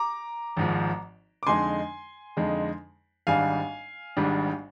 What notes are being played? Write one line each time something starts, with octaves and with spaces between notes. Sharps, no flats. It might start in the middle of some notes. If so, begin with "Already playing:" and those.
Already playing: A#5 D6
G#1 G#2 F3
D6
F2 D3 G#3 D#4 G#5 C6
F2 D3 G#3 D#4
G#1 G#2 G3 D4 F5 G#5
G#1 G#2 G3 D4